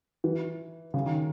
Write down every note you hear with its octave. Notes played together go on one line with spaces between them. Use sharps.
E3
C#3
D#3